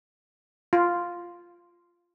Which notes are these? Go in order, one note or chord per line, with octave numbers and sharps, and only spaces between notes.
F4